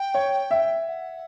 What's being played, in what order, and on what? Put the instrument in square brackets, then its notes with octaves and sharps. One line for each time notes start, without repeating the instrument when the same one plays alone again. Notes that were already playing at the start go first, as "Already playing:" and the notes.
Already playing: [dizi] G5
[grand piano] C#5
E5
[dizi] F#5